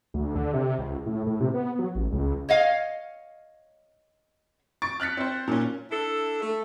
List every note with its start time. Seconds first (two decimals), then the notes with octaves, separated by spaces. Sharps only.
0.14 D2
0.35 D3
0.53 C3
0.79 C#2
1.06 A2
1.26 A2
1.40 C3
1.54 B3
1.79 F#3
1.95 A1
2.12 C#2
2.49 C#5 D#5 F5
4.82 C#6 A6 D7
5.00 F6 F#6 A6 B6 C#7
5.17 C4 C5
5.48 A#2 C#4
5.91 D4 E4 A4
6.42 A3